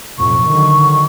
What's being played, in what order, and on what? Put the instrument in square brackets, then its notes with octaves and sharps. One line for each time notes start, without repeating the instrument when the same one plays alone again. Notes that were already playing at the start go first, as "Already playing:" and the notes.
[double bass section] B1 F2 A2 [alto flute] C#6
[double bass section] D3 D#3 F#3